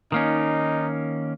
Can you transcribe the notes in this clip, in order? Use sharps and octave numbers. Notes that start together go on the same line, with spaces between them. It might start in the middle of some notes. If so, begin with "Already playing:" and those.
D#3 A#3 C#4 D#4